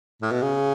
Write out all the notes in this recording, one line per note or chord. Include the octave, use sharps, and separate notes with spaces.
A2
B2
C#3